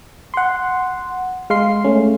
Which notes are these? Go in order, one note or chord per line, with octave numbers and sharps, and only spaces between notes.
F#5 C6
G#3 F5 C6 C7
A3 C#4